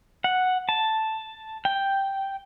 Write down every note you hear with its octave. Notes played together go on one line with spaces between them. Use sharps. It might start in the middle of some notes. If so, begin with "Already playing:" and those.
F#5
A5
G5